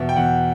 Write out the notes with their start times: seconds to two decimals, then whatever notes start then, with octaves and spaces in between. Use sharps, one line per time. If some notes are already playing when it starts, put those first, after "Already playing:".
Already playing: E2 B2 E5
0.09 G5
0.16 E2 F#5